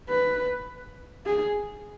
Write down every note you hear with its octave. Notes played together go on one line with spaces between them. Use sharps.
B4
G#4